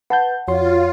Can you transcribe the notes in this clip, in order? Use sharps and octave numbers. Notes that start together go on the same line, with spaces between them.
B4 F#5 A5 G6
F2 F4 F#4 C#5 C6